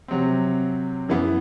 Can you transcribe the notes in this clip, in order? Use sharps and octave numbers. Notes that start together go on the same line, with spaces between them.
C3 F#3 C4
F#2 E3 B3